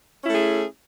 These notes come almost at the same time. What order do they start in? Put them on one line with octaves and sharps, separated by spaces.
C#4 E4 A3 G#4